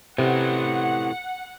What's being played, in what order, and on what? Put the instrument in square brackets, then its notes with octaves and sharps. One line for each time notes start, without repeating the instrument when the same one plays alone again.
[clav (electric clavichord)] C3 [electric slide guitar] E4 A4 B4 [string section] F#5